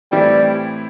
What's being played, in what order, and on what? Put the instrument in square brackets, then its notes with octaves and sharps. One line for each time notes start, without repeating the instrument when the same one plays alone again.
[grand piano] A2 E3 C4 E4 [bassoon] G3